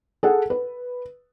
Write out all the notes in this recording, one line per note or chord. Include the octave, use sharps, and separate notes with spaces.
G#4 A4 F#5
B4